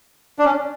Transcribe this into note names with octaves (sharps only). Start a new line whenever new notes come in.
D4
C#4